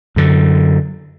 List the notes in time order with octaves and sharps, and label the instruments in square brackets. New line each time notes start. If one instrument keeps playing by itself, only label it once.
[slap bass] F#2 D3